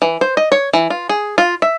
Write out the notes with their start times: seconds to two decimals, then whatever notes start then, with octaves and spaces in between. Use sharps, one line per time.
0.02 E3
0.21 C5
0.37 D#5
0.52 C#5
0.73 E3
0.90 F4
1.09 G#4
1.38 F4
1.62 E5